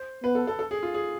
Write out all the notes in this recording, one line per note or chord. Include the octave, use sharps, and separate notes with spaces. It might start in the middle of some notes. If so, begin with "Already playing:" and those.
Already playing: C5
B3 B4
A4
A4
A4
G#4
F4
G#4